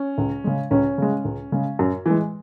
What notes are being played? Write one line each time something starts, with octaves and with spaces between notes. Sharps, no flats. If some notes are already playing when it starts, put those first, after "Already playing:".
Already playing: C#4
C#2
C#3 G#3
C#2 C#4
C#3 G#3
C#2
C#3 G#3
F#2
E3 G#3